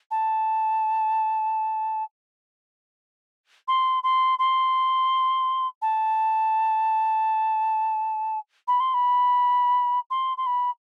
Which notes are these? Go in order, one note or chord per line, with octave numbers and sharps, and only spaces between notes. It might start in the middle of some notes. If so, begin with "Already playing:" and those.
A5
C6
C6
C6
A5
B5
C6
B5
C6
C6
B5